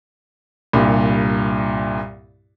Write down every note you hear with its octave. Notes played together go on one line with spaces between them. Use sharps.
C2 G2 A#2